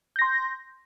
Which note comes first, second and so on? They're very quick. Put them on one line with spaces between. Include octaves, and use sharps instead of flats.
G6 A#6 C6